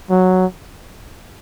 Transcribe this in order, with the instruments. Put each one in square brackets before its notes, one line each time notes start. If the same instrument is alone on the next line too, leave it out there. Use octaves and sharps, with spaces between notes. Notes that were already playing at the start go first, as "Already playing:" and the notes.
[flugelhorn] F#3